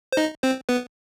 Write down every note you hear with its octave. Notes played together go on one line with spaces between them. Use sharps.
C5
D#4 D#5
C4 C5
B3 B4